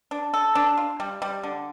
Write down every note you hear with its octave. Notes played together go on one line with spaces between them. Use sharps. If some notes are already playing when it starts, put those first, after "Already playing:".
D4
A4
D4
F4
G3
G3
D3